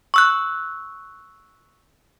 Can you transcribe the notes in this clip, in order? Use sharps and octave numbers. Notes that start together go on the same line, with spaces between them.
C#6 E6 F#6